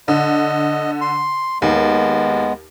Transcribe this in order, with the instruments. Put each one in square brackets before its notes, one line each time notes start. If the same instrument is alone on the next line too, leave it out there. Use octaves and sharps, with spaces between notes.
[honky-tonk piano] D3 [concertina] D#5
[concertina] C6
[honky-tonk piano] D#2 [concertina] G#3 B3